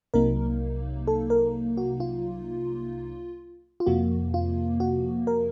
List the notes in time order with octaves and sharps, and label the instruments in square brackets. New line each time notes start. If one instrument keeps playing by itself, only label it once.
[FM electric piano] C2 C3 F#3 A#3 D#4 A#4
A4
A#4
F#4
F4
F4
F2 C3 F3 A#3 F#4
F4
F#4
A#4